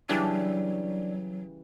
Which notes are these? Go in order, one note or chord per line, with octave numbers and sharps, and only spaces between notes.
C#3 E3 F#3 G3 D4